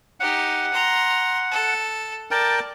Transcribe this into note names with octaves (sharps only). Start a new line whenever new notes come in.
D#4 G4 F#5
A#5 C6
A4
A#4 D5 G5 A5